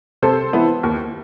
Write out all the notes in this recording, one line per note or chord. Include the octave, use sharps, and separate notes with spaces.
C3 A4 C5
E3 B3 E4
D#2